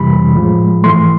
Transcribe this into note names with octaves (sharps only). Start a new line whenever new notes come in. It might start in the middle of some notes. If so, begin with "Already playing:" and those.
Already playing: F2 C3 E3 G3 B5
A2 F3 G#3
G#2 E3 A3 C6